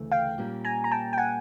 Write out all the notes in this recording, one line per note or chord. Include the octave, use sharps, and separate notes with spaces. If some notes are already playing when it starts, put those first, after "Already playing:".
Already playing: D2 C#3 E3 A3
F5 G5
A#2 G3 A#3 C#4
G#5 A#5
A#5
G5 A5
G5
F#5 G#5